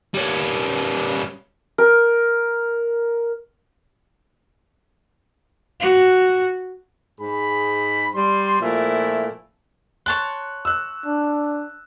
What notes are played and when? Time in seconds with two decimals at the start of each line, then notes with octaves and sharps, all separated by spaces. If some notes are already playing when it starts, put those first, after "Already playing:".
0.14 G3 C#4
1.78 A#4
5.80 F#4
7.20 G#2 G#4 B5
8.15 G3 C6
8.61 A#2 F3 A3 E4
10.06 C#5 A5 C6 F#6
10.65 E6 F#6
11.06 D4